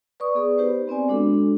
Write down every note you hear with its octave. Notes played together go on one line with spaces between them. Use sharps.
B4 D5 C#6 D#6
B3 G#4 D5
D#4 G4 B4 C5
B3 C4 D5 G#5
G#3 D4 F#4 A4